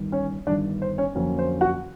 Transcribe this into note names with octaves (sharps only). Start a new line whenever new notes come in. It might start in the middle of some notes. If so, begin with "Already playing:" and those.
Already playing: G1 G2 D#3
C#4 C#5
G1 G2 D#3 D4 D5
C5
C#4 C#5
F2 D3 F#3 A#3 C#4
C5
F#4 F#5